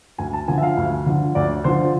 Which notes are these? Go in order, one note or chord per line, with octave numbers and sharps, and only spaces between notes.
D2 G#5
A5
D3 F3 G#5
E5
F5
D2
D3 F3
D2 D5
D3 F3 C5